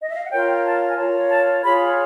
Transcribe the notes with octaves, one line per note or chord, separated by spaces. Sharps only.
D#5
E5
F5
F#5
F4 A#4 C#5 G5
A5
G#5
F4 A#4 C#5 A5
A5
F4 G#4 C#5 B5